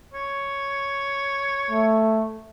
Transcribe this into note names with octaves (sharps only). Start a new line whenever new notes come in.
C#5
A3